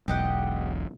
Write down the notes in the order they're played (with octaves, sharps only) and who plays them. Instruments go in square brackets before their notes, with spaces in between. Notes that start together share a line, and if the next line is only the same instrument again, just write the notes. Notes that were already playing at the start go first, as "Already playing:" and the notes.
[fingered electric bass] E1 B1 [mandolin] G4 D#5 F#5